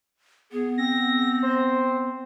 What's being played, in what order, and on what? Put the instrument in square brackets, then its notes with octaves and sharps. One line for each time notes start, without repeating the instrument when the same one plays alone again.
[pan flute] B3 [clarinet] G#4
[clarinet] C4 [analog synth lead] A#6
[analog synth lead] C5